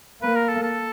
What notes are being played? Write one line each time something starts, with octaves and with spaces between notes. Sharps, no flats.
A#3 B4
A#4
A4
A4